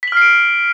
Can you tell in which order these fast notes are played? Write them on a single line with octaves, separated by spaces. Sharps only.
B6 F#7 F6 C7 D7